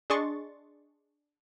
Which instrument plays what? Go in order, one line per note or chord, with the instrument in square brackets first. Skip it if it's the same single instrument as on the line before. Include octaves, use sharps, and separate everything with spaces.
[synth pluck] D4 G#4 D#5 C6 C#6 A6